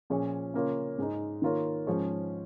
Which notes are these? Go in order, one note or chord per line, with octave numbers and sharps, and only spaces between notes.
A#2 F3 C#4 G#4 C#5
C#3 A#3 F4 C#5
G#2 G#3 D#4
D#3 A#3 F4 A#4 C#5
G#2 F3 C#4 G#4 C#5